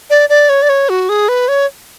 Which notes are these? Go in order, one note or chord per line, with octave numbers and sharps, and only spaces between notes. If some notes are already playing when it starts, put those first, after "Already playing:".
D5
D5
C#5
D5
C#5
F#4
G#4
B4
C#5